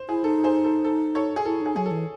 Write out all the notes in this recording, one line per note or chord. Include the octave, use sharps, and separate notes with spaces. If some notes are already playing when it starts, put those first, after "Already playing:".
Already playing: C5
E4 G#4
D#4 A4
G#4 C5
A4
A4
A4 C#5
G#4
E4 A4
D#4 G#4
F#3 G#4
A4
E3